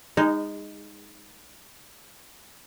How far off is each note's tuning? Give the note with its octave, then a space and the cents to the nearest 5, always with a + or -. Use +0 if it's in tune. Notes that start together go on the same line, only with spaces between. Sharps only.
G#3 -25 D#4 +0